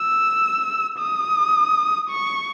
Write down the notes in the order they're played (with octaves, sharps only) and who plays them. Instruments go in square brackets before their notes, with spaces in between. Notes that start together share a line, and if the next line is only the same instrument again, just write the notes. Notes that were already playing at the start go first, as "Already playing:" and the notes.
Already playing: [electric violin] E6
D#6
C#6